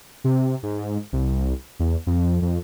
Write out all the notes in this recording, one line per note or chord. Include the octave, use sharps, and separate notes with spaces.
C3
G#2
C2
E2
F2
F2